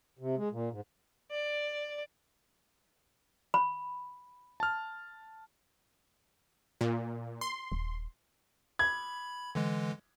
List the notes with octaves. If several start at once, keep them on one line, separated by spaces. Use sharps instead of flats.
C3
G#3
A#2
G#2
D5
B5
A5 F6
A#2
C6
D#1
B5 G#6
D3 E3 G#3